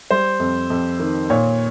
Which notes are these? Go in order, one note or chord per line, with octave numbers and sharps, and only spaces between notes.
G3 C5
F2
F2
D#3
A#2 C#5